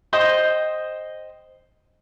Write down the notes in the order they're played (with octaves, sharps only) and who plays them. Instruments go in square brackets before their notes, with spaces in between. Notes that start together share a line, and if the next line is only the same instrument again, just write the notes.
[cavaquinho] C5 D#5 G5